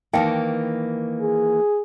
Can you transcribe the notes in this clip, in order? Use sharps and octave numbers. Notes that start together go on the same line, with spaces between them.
D#3 E3 A#3 D#4 F5 G5
G#4